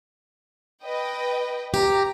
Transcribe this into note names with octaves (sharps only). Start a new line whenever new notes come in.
B4 D#5 G5
G4 A#5